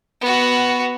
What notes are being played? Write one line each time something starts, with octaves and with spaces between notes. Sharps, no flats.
B3 F#4